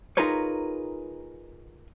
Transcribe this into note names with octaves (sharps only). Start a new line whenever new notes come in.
D#4 F4 G#4 A#4 B4 C#5